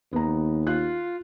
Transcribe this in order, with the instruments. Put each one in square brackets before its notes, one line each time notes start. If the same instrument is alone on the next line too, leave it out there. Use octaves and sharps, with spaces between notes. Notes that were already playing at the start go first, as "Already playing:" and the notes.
[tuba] D#2 [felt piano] B3 A#5
[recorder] F4 [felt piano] F#6